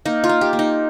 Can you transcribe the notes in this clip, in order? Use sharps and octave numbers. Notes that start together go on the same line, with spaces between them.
A#3 D#4
F4
A#3
G4
A#3
D#4